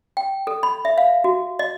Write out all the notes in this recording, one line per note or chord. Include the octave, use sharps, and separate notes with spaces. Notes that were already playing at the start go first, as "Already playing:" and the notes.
G5
A4
B5
E5
F5
F#4
D#5